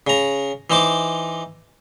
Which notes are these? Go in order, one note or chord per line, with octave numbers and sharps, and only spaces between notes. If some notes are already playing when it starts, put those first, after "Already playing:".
C#3 A#5
E3 D#4 C5 D6